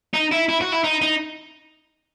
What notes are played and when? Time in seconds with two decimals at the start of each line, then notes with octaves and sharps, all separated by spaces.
0.14 D#4
0.32 E4
0.49 E4
0.61 F#4
0.72 E4
0.84 D#4
1.02 D#4